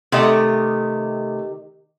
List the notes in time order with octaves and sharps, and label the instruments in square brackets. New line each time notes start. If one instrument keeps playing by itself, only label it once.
[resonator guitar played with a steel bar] C3 A3 [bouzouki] D#3 G4 D#5